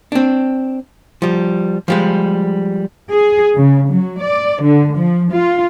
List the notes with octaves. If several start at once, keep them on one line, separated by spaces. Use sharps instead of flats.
C4 D4
F3 G3
F3 G3 G#3
G#4
C#3
F#3
D5
D3
F3
F4